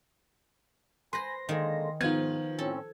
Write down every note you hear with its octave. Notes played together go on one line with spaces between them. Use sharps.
B4 C5 G#5 B5 C6 A#6
D3 D#3 G#3 A#3 G#4
G#2 D#3 F3 B3 F4 G#6
A2 C4 C#4 A4